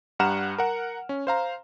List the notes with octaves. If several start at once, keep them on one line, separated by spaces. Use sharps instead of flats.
G2 G3 F#5 A#5 F6 E7
A#4 F#5
C#4
C5 F5 A#5